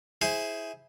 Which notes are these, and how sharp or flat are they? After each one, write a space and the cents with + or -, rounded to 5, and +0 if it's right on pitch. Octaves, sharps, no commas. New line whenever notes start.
E4 -10 G#4 +10 C5 +0